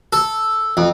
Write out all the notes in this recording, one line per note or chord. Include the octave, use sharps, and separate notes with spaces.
A4
F2